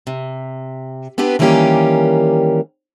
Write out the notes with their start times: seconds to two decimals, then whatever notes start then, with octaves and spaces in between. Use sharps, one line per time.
0.07 C3
1.18 B3 C4 D4 G4 B4
1.39 D#3 E3 G3 A#3 C#4 G4